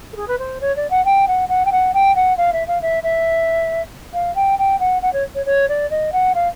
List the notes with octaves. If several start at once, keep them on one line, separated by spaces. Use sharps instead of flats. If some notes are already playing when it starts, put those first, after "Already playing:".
A4
G#4
B4
C5
C#5
D5
F#5
G5
F#5
F#5
G5
F#5
G5
F#5
F5
E5
F5
E5
E5
F5
G5
G5
F#5
F#5
C#5
C#5
C#5
D5
D#5
F#5
F5